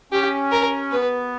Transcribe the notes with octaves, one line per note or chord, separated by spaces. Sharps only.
C#4 G4
A#4
B3 B4